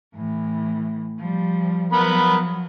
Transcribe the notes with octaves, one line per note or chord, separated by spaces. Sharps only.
A2 E3
F3 G3
F3 F#3 B3 A#4 B5